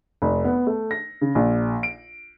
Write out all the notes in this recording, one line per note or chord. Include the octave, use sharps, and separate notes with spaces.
F1
B3
A3
A#6
C#3
A#1
D7